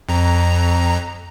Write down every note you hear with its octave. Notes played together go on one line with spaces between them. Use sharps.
F2 A#5